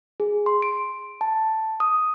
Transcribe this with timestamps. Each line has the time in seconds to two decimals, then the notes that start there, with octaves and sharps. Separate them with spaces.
0.20 G#4
0.46 C6
0.62 D7
1.21 A5
1.80 D#6